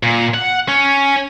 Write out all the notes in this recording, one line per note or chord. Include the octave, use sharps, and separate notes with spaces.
A#2
F#5
C#4